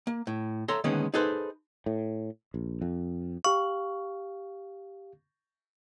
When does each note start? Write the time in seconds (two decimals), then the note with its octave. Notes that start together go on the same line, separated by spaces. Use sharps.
0.07 A#3
0.27 A2
0.68 A4 C#5 E5 A#5 C6
0.84 D3 D#3 G#3 A#3 B3 C#4
1.14 D#4 G#4 A4 B4 C5
1.86 A2
2.54 A#1
2.82 F2
3.45 G4 F5 C#6